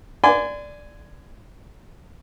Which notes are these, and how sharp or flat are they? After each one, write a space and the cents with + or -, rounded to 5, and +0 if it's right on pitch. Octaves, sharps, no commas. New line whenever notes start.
D5 +0 G#5 +0 C6 -40